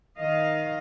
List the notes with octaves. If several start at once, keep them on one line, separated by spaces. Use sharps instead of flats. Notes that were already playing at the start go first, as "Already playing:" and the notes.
D#3 D#5 F5